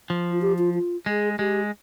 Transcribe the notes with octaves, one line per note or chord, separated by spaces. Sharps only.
F3
F4
G4
F4
F4
G#3 G#4
G#3 G4